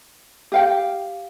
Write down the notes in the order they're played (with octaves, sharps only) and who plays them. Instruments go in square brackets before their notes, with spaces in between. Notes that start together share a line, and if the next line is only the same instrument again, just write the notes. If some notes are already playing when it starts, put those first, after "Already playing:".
[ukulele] G4 F5 G5